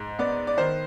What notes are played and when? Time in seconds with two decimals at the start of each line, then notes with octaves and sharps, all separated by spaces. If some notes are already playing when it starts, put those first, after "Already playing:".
Already playing: G#2
0.19 B3 D5
0.47 D5
0.58 D#3 C5